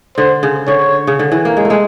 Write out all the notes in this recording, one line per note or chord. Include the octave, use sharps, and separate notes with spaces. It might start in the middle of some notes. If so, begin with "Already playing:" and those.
D3 C5
C#3
D3 C#5
C#3
D3
E3
A#3
G#3
A3
G#3